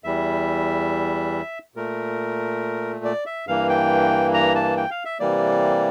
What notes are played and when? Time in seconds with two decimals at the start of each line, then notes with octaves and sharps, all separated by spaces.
0.04 E2 E3 G3 E5
1.76 A#2 A3 A#4
3.05 D5
3.26 E5
3.47 G2 E3 A#3 F5
3.69 G5
4.34 A#5
4.55 A5
4.77 G5
4.91 F5
5.05 E5
5.20 C3 E3 G3 A#3 D5